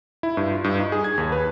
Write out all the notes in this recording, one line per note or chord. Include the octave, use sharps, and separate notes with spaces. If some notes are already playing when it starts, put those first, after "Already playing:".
E4
G2
F4
G2
D#4
G#4
G#6
D#2
B4